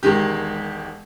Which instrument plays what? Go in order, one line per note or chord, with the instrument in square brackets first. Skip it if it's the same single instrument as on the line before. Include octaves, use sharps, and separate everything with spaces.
[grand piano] E1 D#3 G#3 G4